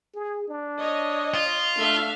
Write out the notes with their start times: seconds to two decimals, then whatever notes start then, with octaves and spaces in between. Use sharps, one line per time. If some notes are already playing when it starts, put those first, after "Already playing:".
0.14 G#4
0.48 D4
0.79 C#5 D#5
1.35 F4
1.78 A3 D4 E5 F5